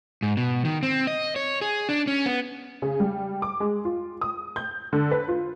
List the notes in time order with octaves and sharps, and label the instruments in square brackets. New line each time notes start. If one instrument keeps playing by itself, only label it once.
[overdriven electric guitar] G#2
B2
D#3
C4
D#5
C#5
G#4
D4
C#4
B3
[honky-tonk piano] C#3
G3
D6
G#3
F4
D#6
G6
D3
B4
F4